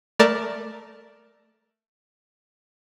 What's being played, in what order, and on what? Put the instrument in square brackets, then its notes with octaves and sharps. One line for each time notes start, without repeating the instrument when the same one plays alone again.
[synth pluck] A3 A#4 D5 A5